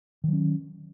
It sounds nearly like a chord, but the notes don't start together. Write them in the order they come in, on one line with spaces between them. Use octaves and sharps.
D#3 F#3 C#4